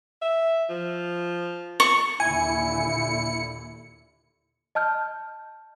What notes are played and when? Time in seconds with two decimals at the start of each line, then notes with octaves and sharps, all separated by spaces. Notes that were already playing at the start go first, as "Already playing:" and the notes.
0.22 E5
0.69 F3
1.80 C#6
2.20 D#2 A#2 D3 E4 G#5 C#7
4.75 D#5 A5 F6 G6